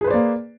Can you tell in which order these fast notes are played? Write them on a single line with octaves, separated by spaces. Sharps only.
G#4 B4 C5 D5 A#3